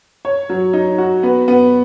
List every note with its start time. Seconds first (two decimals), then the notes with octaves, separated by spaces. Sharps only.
0.25 C#5
0.49 F#3
0.73 D#4
0.98 F#4
1.23 B3
1.48 B3